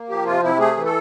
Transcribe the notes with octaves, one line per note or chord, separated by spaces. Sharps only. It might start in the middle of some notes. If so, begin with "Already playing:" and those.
Already playing: A#3
F3 G4
C3 F4
C3 E4
A3 G#4
E3
A4